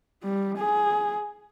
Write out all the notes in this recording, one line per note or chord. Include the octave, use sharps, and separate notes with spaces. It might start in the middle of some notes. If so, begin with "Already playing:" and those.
G3
G#4